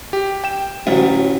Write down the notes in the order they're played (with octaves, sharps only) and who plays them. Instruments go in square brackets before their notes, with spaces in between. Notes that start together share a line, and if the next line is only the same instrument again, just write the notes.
[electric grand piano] G4
G5 E7
[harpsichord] A1 D2 A2 [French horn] F#3